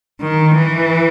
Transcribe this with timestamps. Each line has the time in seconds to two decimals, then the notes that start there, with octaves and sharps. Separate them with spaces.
0.22 D#3
0.56 E3